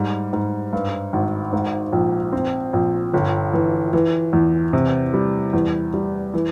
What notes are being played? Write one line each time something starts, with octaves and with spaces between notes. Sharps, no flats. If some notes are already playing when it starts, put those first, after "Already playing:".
Already playing: G#2 G3
G#2
G2
G#1
G#2
A#1
C4
A#1
G1
E3
E3
E2
C3
G3
E2
G3
E3